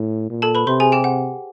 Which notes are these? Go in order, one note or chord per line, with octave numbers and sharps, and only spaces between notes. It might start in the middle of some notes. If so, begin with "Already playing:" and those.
Already playing: A2
A#2
A4 A5
B4 B5
C3 C5 C6
G#4 G#5
G4 G5
F#5